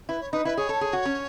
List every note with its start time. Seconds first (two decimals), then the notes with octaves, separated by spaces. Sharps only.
0.09 E4 B4
0.21 C#5
0.33 D#4 B4
0.45 E4 B4
0.57 G#4 C#5
0.69 A4
0.81 G#4
0.93 F#4
1.05 C#4